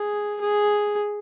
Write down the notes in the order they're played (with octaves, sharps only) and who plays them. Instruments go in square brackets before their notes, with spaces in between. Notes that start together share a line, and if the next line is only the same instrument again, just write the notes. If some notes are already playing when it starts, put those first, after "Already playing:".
Already playing: [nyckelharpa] G#4
G#4